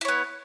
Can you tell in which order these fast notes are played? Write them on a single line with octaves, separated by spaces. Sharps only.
E4 C#5 B3